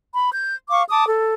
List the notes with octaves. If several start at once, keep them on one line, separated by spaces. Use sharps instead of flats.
B5
G6
F5 C#6 D6
A5 D6 D#6
A4